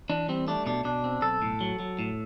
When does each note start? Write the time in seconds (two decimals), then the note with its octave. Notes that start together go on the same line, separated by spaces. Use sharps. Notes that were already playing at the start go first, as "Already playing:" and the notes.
0.10 E3 D4
0.29 G3 C4
0.47 A3 D4
0.66 B2 D4
0.84 B2 D4
1.04 C4
1.22 B1 A4
1.42 A2
1.61 F#3
1.80 F#3
1.99 A2